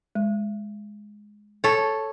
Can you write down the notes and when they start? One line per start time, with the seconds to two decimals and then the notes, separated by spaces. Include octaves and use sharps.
0.15 G#3
1.64 A4 C#5